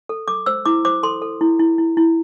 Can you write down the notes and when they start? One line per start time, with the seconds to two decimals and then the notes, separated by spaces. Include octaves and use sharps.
0.09 A4
0.28 A4 D6
0.46 C5 E6
0.66 E4 D6
0.85 C5 D6
1.03 A4 C6
1.22 A4
1.41 E4
1.59 E4
1.78 E4
1.97 E4